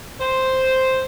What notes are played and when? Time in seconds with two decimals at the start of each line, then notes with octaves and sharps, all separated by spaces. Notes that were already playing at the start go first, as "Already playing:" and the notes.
0.20 C5